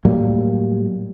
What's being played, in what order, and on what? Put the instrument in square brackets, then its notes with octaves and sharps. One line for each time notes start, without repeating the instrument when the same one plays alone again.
[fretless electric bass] A2 F#3 G3 A#3